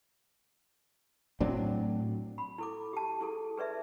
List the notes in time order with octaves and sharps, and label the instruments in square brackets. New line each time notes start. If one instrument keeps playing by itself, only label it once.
[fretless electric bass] A2 F#3 C4 D4
[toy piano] B5
E4 A4 D6
G4 A5
E4 G#4 A4
G#4 B4 D5 E5